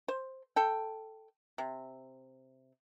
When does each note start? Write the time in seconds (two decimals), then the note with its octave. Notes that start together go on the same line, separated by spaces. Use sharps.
0.08 C5
0.56 A4 G5
1.58 C3